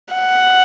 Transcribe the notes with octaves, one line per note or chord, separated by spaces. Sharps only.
F#5